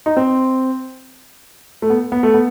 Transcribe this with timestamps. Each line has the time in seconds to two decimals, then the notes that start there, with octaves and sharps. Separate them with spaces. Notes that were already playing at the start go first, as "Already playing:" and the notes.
0.06 D#4
0.17 C4
1.82 A3
1.90 B3
2.12 B3
2.23 A3
2.34 B3